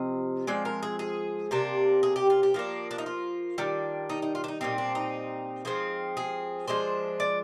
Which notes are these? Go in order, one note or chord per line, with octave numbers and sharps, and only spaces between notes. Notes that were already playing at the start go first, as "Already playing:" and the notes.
Already playing: C3 F3 C4 D#5
F3 G#3 C4 D5
A#4
G#4
G#4
C3 G3 A#3 D4
G#4
G4
F4
G4
F3 A#3 D4
D4
D#4
F4
D#3 G3 D4
D#4
D#4
F4
D4
D#4
A#2 G3 C4 D#4
D4
D#4
F3 G#3 C4
G#4
F3 G#3 D4 C5
D5